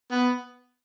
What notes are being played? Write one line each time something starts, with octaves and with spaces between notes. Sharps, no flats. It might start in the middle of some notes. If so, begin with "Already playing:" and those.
B3